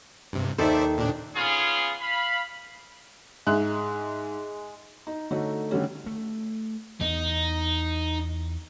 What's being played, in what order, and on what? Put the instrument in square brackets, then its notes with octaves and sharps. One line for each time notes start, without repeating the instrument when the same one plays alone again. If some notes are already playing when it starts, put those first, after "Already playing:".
[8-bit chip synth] G2 C3
[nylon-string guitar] D#2 D#3 A4 [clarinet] D#4 [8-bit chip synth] C5 D5 E5
[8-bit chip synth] A#2 D4
[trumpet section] B3 C#4 F4 G#4
F5 B5
[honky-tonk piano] G#2 E5 F#6 [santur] G#3
[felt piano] D#4
D3 A3 D#4 F#4 C#5
D3 D#3 G3 A3 C#4
[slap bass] A3
[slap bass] E2 [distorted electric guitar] D#4